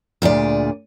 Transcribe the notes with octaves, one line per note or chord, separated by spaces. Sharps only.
D2 A#2 G#4 D5